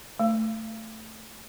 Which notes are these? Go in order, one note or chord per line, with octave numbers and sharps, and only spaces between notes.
A3